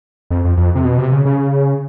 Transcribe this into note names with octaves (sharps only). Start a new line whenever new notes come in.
F2
F2
F2
C3
B2
C3
C#3
C#3